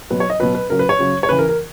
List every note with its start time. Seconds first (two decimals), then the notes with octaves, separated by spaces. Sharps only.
0.10 B2 F#3 B4
0.20 C#5
0.30 D#5
0.40 B2 F#3 B4
0.55 B4
0.70 C#3 F#3 A#4
0.79 B4
0.89 C#5
0.99 C#3 F#3
1.23 C#5
1.29 C#3 E3 B4
1.39 A#4
1.49 A#4